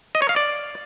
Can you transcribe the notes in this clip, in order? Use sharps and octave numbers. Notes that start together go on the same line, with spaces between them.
D#5
C#5
F5
D5